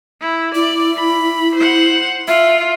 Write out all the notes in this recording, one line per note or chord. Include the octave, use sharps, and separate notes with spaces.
E4
E4 D5
B5
C5 F#5
F4 E5